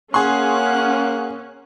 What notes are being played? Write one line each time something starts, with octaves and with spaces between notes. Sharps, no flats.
A#3 C#4 G#4 F#5 C6 F#6